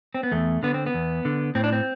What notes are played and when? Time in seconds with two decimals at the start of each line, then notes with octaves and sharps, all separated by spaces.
0.14 C4
0.23 B3
0.32 E2 A3
0.63 D3 B3
0.74 C4
0.86 B3
0.94 E2
1.25 D3
1.55 A2 C4
1.64 D4
1.72 C4